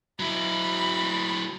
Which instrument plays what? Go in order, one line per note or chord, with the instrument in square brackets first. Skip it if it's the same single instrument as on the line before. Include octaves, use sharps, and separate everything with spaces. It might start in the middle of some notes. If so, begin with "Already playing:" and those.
[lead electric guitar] F#3 E4 [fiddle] B5